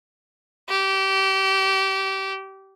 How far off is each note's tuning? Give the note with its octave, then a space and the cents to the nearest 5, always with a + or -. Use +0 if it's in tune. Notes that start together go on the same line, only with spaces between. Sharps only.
G4 -25